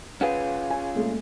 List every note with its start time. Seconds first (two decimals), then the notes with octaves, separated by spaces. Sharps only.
0.21 C#4 F4 G#4 B4 F#5
0.70 G#5
0.95 A#2 G#3 A3